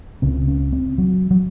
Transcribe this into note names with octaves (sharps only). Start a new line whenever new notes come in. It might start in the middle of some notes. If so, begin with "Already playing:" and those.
C#2 C#3 C4
C#4
C4
F#3
F#3